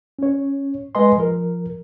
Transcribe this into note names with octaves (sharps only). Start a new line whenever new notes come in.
C#4 C#5
G#3 B4 D#5 G#5 C6
F3 A#4